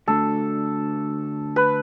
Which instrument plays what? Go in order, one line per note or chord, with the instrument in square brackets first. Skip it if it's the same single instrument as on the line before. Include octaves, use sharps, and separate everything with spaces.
[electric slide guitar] D3 A3 D4 F#4 [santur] A4
[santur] B4